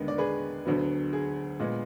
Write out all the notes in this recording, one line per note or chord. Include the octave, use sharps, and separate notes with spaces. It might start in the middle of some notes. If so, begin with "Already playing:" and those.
Already playing: D#2 D3 G#3 B3 A#4
D5
G#4 B4
D2 D3 F#3 B3
G#4
A#2 G#3 B3